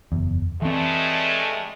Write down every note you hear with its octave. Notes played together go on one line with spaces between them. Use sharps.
F#1 E2
G2 E3 G#3 A3 C4